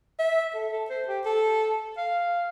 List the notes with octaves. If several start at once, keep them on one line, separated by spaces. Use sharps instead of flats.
E5
A4
A4
C5
G4
A4
F5